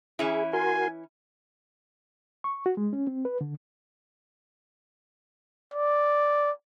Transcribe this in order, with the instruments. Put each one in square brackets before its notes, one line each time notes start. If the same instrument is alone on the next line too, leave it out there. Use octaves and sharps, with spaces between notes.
[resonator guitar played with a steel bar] E3 C#4 E4 [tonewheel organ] G#4
[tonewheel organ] F#4 A#4 C6 [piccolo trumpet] G#5
[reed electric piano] C#6
F#4
G#3
C#4
C4
B4
D3
[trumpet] D5